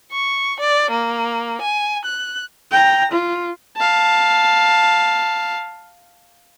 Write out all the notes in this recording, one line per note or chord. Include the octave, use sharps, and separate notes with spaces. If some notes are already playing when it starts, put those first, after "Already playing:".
C#6
D5
A#3
G#5
F#6
G5 A#5
F4
F5 A5